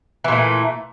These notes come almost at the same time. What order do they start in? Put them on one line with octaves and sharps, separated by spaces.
E3 A#2 A3